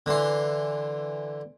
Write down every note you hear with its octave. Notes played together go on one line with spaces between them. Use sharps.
D3 E3 C6